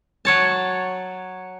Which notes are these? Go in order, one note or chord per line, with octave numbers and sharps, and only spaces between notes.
F#3 C#5 A5